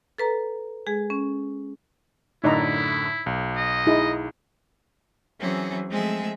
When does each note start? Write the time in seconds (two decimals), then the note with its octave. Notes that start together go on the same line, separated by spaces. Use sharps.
0.18 A4 B4 A#5
0.87 G#3 G#4
1.10 C#4
2.44 F#2 A2 D3 D#4 E4 D5 A#5
3.26 B1
3.56 D#5
3.87 D#4 E4 G#4
5.38 E3 F#3 C4 C#4 G#4
5.88 F3 G#3 A3 C4 G#4 E5